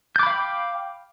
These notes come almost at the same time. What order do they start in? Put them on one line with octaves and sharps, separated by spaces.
G6 D6 B5 F5 G5